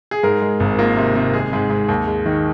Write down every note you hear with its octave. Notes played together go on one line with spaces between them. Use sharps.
G#4
G#2 A#4
G#3
G#1
A#3 F4
C3
C3
G#3 G#4
G#2
G#2
D#2
G#3
D#3